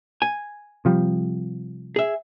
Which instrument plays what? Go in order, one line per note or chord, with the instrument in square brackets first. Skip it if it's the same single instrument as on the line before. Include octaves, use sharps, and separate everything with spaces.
[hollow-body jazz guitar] G#5
[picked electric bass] C3 F3 G3
[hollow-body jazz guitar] G#4 E5